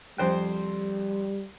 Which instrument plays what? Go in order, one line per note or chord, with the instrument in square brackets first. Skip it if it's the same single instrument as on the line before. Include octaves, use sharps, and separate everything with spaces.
[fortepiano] F2 C5 G5 [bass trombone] G3